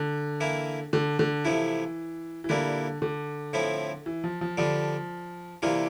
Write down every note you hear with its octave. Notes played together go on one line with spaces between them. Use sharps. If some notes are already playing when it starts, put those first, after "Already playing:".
Already playing: D3
E3 A#3 E4
D3
D3
C3 E3 F3 A3 E4
E3
A#2 D3 G3 A#3 E4
D3
A2 F3 C4 E4
E3
F3
F3
D3 F3 G3 D4
C3 E3 G3 A#3 D4 F4